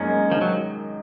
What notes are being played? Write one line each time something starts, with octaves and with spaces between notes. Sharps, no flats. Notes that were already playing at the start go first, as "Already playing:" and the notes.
Already playing: F#2 G#3 A#3 C#4 D#4
G#3
D#3 F3
F#3